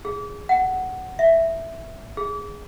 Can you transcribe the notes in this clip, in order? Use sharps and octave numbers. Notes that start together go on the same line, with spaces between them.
G#4
F#5
E5
G#4